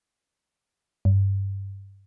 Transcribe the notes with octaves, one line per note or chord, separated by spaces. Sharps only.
G2